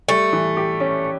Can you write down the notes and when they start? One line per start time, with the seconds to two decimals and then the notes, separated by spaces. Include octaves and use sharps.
0.09 G3 A3
0.33 E3
0.57 G4
0.80 C#4